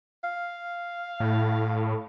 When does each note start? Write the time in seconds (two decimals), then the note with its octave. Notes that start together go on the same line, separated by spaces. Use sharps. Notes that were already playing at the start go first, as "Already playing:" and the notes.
0.24 F5
1.20 A2